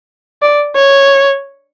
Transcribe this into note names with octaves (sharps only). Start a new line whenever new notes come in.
D5
C#5